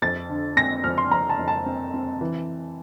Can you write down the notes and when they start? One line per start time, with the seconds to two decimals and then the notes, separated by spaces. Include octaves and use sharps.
0.02 F2 A6
0.29 D3
0.57 C4 A#6
0.84 F2 F6
0.98 C6
1.11 F2 A#5
1.29 A5
1.39 F2
1.48 A5
1.66 C4
1.94 C4
2.21 E3